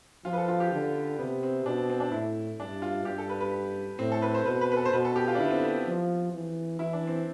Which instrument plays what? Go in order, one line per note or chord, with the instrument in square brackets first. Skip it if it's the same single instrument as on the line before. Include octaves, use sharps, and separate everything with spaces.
[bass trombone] F3 [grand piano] F4
[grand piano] B4
A4
F4
G4
[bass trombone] D3
[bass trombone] C3 [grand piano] B3
[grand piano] C4
[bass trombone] B2 [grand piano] D4
[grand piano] C4
C4
D4
[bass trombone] A2 [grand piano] E4
[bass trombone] G2 [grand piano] D4
[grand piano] F4
[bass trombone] G2 [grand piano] G4
[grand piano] A4
B4
B4
[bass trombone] A2 [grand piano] C4
[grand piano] A4
B4
C5
[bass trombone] B2 [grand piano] B4
[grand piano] B4
B4
A4
C5
[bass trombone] B2 [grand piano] B4
[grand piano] A4
G4
F4
D4
[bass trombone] D3 [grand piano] E4
[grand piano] B3
C4
B3
[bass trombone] F3
E3
[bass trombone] E3 [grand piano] E4
[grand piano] D4
C4